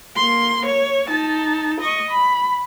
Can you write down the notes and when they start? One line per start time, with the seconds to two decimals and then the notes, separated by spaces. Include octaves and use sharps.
0.16 A#3 C6
0.66 C#5
1.07 D#4 A5
1.81 D#5 C#6
2.11 B5